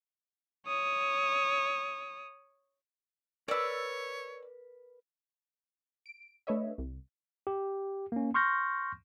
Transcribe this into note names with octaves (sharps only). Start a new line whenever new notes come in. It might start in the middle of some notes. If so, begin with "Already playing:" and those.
C#5 D#6
A#4 B4 C#5 D5 E6
D7
A3 D4 B4 C#5 D#5 E5
C2
G4
A#3 C#4
C6 C#6 F6 G6 A#6